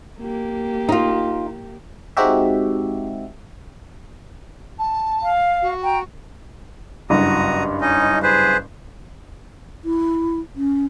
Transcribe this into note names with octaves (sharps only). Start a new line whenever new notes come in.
A#3 G4
D#4 F4
G#3 C4 D#4 F#4 G4 E5
A5
F5
F#4
G5 A#5
F#1 G2 F#4 A#5 D#6
C#4 D#4 D#5
G#4 B4 C5
E4
C#4